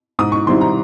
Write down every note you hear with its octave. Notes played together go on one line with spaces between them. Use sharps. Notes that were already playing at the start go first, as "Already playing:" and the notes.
G#2 D#6
C#6
D#3 G3 C4 E4 C6
A#5